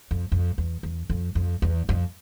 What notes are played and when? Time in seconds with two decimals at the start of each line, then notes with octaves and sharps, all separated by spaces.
0.11 F2
0.32 F2
0.58 E2
0.83 E2
1.10 F2
1.35 F2
1.62 E2
1.89 F2